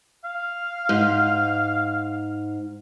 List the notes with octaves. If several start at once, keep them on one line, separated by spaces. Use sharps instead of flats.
F5
G#2